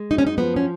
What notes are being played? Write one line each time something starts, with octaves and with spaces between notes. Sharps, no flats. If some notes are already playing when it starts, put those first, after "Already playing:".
Already playing: G#3
F#2 D#4
C#4
D#4
F3 B3
C#4